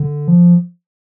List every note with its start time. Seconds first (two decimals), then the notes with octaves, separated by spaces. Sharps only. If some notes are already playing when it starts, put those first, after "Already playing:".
Already playing: D3
0.28 F3